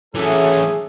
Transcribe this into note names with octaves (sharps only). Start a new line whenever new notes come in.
E3 F#3 C#4 D4 G#4 A4 E5